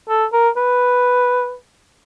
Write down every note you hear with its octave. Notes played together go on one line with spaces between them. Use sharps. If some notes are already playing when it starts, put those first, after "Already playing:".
A4
A#4
B4